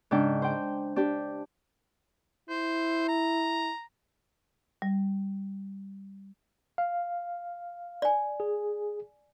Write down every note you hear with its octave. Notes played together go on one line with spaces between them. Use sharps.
G#2 C#3 D4 G5
C5 G5
D4 G4
E4 C5
A#5
G3
F5
D5 G#5
G#4